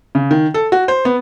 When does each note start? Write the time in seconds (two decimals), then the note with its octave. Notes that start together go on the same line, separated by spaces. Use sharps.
0.15 C#3
0.31 D#3
0.54 A4
0.72 F#4
0.88 C5
1.05 B3